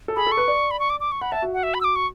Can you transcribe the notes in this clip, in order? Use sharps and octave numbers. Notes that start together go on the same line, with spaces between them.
A4
G#4 B5
A4
C#6
B4
D5
B5
C#6
D6
D6
C#6
F#5 B5
E5 A5
F#4
F#5
E5
B5
E6
D6
C#6